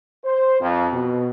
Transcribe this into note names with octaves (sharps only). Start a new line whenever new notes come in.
C5
F2
B2